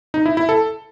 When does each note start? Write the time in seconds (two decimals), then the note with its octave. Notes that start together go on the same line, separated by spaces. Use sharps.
0.14 D#4
0.26 E4
0.37 E4
0.49 A4